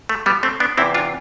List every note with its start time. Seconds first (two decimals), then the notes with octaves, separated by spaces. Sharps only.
0.09 A3
0.26 G3 B3
0.43 A3 C4
0.60 B3 D4
0.77 E2 C3 E3 C4 E4
0.94 D4 F4